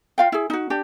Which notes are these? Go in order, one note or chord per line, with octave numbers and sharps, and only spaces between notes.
F4 F5 G5
E4 G#4
D#4 F#4
D4 G4